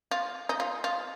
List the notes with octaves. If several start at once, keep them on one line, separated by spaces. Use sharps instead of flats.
F4
D#4
F4
F4